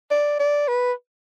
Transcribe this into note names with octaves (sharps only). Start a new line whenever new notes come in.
D5
D5
B4